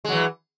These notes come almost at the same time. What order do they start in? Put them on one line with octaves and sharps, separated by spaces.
G#3 F#3 E3